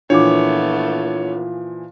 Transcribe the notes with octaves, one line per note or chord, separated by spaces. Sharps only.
A#2 E3 F3 A3 B3 D4 C#5 D6